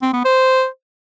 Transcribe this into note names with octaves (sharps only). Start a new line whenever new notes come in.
C4
B3
C5